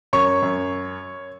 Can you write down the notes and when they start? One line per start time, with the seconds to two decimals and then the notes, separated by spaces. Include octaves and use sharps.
0.13 F#2 C#5 C#6
0.42 F#2